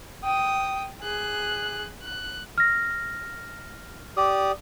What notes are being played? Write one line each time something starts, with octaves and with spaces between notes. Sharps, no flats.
G5 D#6
G#4 F#6
F#6
F6 A#6
G4 D5 D#6